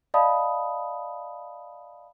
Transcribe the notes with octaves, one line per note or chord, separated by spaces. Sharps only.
D5 D#5 F5 A5 B5 D#6